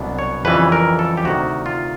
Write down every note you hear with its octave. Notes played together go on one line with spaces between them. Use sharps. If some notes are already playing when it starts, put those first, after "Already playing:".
Already playing: C2 B2 F#3 B3 D4
C#5
F2 C#3 E3 G3 B4
A#4
A4
G4
D2 C3 D#3 F#4
F4